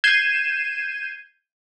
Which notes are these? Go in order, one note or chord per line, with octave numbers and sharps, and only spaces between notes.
G6 G#6 C7 D#7 E7